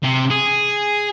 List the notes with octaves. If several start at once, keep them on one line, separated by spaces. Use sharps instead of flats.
C3
G#4